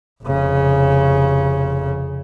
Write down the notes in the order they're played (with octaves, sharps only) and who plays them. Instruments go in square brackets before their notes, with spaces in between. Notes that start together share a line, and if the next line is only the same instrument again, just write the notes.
[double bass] F1 C#3